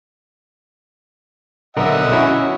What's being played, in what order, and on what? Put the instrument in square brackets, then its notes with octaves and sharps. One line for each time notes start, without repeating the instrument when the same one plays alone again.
[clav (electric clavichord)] B1 D3 A#4 [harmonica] D#5 E5 F#5
[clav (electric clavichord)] C#4 E4 F#4